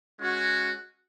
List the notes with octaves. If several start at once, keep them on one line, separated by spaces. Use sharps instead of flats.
G#3 C#4 F#4